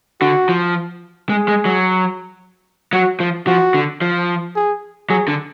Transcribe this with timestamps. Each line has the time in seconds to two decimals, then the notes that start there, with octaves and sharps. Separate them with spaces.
0.21 D3 F#4
0.49 F3
1.29 G#3 G#4
1.48 G#3
1.65 F#3
2.93 F#3 F#4
3.20 F3
3.47 F3 F#4
3.74 D3
4.01 F3
4.56 G#4
5.10 F#3 G#4
5.28 D3